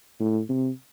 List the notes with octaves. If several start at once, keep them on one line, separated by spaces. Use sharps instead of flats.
A2
C3